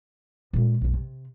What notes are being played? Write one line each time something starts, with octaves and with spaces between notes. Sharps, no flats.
A#2 G#3
B1 F#2
C3